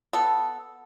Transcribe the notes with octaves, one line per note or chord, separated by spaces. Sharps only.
B3 A4